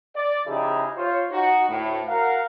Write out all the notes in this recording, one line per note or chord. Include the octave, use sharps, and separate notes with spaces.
D5
C#3 F3 D#4 E4 G4 G#4
F4 C5 C#5
D#4 F#4
D2 A2
F#4 A#4 F5 F#5